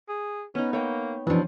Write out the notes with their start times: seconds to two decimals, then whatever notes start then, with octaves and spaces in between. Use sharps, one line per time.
0.09 G#4
0.55 B3 C#4 D#4
0.73 A#3 C#5 G5
1.27 B2 E3 F3 C#4 D4